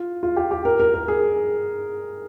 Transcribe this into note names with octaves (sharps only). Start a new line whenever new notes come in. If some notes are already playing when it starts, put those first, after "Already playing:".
Already playing: F4
F4
G4
G4
A#4
A#4
A#4
G#4